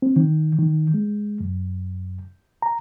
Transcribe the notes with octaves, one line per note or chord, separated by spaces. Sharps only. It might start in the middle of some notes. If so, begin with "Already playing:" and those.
C4
D#3
D#3
G#3
F#2
A#5